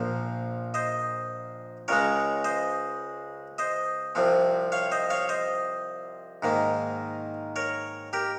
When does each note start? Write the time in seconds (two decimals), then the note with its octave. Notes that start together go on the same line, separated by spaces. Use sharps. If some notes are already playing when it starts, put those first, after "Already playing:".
Already playing: A#1 A#2 F3 C5
0.74 C5 D#5
1.88 C#2 C#3 G#3 A#4 C#5
2.45 C5 D#5
3.58 C5 D#5
4.15 C2 C3 F3 C4
4.72 C#5 F5
4.92 C5 D#5
5.10 C#5 F5
5.29 C5 D#5
6.43 G#2 D#3 A#3
7.56 A#4 C#5
8.13 G4 A#4